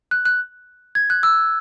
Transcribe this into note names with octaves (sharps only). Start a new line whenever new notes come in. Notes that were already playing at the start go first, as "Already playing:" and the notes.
F#6
F#6
G#6
F#6
E6